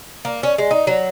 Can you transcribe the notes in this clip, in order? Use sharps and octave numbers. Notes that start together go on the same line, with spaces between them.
A#3
C#4
G#3
D#4
F#3